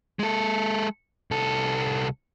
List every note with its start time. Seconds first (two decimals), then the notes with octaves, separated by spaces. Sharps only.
0.19 G#3 A4
1.31 C2 A4